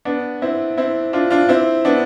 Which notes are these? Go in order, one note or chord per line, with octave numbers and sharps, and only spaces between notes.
B3 D4
C4 E4
C4 E4
D4 F4
D4 F4
C4 E4
B3 D4